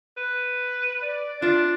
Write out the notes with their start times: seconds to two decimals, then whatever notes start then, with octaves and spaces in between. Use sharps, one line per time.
0.17 B4
1.03 D5
1.42 D4 F4 E5